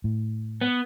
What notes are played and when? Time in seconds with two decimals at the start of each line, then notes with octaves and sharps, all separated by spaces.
0.04 A2
0.61 B3